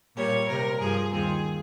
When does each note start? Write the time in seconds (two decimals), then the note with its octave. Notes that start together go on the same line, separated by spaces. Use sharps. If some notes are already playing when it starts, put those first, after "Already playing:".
0.15 A#2 G3 A#3 C#5
0.48 C3 G3 C4 A#4
0.80 G2 F3 A#3 G#4
1.12 D#2 D#3 G3 C4 F4 G#4